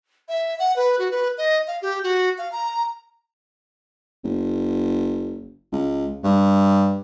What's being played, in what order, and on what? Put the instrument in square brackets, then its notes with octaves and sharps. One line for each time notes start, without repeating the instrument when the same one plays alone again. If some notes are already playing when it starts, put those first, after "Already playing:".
[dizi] E5
F#5
B4
F#4
B4
D#5
F5
G4
F#4
F5
A#5
[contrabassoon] F#1
C#2
G2